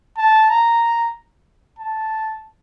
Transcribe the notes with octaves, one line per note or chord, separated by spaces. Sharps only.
A5
A#5
A5